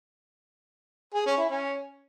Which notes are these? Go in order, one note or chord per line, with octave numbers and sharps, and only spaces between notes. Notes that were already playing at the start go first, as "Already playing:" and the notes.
G#4
C#4
E4
C#4